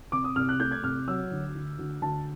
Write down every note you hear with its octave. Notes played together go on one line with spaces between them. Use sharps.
C3 D6
D#6
C2 F6
F#6
A3 G6
G#6
C2 F6
F#3 E6
D2
D2
D2
D2 A5